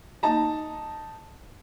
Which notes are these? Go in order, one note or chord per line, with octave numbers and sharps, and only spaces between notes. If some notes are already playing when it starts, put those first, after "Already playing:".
D#4 A5 A#5